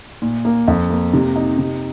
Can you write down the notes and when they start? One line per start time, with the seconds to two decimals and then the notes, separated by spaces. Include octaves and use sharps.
0.22 A#2
0.45 A#3
0.68 F2
0.90 A#3
1.13 C3
1.36 D#4
1.59 C3